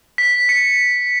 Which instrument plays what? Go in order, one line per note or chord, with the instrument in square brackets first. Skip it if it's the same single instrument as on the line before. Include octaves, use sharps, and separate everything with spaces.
[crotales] B6
C#7